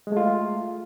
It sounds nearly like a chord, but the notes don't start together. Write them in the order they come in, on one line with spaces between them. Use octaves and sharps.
G#3 A3 F4